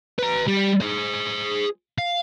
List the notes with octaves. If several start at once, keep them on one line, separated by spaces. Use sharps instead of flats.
B4 A#5
G3
G#4 C5
F5